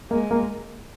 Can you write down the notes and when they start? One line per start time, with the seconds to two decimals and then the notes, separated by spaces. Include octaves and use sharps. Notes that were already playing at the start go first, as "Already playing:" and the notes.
0.11 G#3 A#3
0.31 A#3